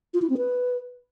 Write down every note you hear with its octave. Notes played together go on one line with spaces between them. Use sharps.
F4
E4
C4
B4